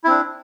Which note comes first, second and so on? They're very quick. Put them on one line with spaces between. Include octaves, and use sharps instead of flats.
E4 C4 D4